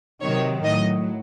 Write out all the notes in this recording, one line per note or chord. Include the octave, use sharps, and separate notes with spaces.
C3 D#3 F#3 C#5
A2 F#3 D#5